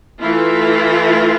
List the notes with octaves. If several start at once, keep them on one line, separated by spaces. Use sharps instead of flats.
E3 A3 E4 F4